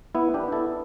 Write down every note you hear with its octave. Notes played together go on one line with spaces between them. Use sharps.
B3 E4
D4 G4
B3
E4 A4